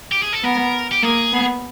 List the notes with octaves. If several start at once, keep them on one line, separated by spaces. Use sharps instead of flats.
G4
G#4
A4
B3 A#4
G4
A#3 G#4
B3